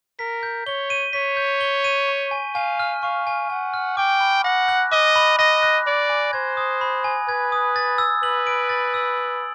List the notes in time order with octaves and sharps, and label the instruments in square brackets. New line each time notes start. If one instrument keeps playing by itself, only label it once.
[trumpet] A#4 [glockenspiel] B6
[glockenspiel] G6
[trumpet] C#5 [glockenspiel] G7
[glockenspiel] D#7
[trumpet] C#5 [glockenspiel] B6
[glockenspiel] G6
G7
D#7
C#6
G#5
[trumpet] F5 [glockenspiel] G#5
[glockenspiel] F6
[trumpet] F5 [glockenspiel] C#6
[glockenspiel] G#5
[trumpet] F#5 [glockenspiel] G#5
[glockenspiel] F6
[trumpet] G5 [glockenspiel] D6
[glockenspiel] B5
[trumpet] F#5 [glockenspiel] A#6
[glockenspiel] F#6
[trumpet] D#5 [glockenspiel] D6
[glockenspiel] B5
[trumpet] D#5 [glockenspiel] A#6
[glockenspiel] F#6
[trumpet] D5 [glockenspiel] B5
[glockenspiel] G#5
[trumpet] C5 [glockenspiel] G#6
[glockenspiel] D#6
B5
G#5
[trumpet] B4 [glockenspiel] G#6
[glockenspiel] D#6
A6
E6
[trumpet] B4 [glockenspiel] F#7
[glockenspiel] D7
A6
E6
F#7